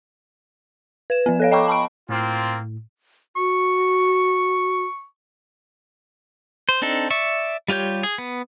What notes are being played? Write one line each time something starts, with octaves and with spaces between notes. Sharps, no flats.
B4 E7
F3 B3
A4 C#5 F5
D#5 G5 A#5 B5 C#6 D6
A5 B5 C#6 D7
A2 A#3 C4 F4
F#4 C#6
C5
C4 D4 D#4 A4
D5 E5 C#6
G3 F4 G4 C#5 G6
G#4
B3